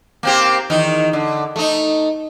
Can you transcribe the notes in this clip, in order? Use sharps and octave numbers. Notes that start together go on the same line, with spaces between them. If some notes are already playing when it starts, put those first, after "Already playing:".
A#3 C4 G4
E2 D#3 D#4
D3
A3 D#4